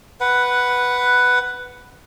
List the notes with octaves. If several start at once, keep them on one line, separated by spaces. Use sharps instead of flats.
B4 F#5